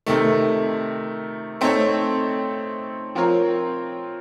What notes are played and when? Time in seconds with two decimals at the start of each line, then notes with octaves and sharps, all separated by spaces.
0.06 C3 D#3 A3
1.61 A3 C4 D#4 A4 C#5
3.15 F3 C4 F4 A#4 C#5